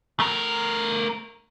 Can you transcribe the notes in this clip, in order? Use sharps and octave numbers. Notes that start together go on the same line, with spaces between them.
A3 A#4